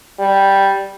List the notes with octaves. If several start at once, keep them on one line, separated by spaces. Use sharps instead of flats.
G3